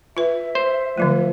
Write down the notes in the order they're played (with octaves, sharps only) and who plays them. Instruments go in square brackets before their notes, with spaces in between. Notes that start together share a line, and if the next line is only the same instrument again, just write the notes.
[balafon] F4 B4 [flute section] E5
[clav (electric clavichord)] C5
[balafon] D3 F#3 A3 [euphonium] F3